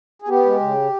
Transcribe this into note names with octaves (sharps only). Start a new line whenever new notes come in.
G#4
B3 G4
G#3
C#3